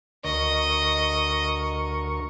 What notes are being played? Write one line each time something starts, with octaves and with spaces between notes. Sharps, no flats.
D2 A#4 D#5 C#6